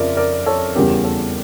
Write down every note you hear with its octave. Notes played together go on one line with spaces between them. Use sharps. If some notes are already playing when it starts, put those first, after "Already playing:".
Already playing: F2 C#3 F3 A#4 D5 E5
A#4 D5
A4 C#5
E2 C#3 G3 G4 A#4
A4